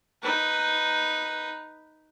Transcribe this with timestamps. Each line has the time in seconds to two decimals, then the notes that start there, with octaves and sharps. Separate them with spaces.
0.23 D#4 B4